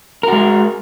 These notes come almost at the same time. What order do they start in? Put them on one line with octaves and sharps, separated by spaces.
A#4 F#4 G#3